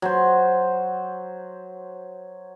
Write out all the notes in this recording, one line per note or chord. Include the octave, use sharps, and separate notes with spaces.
F#3 C5